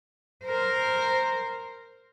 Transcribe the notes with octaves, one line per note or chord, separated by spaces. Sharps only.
A#4 C5